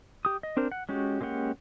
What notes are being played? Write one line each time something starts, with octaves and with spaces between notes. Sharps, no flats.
G4 D#6
D#5
C4 D4 A#4 C5
F#5
G#3 C#4 F#4 G4
G#3 A#3 C#4 G4 F#5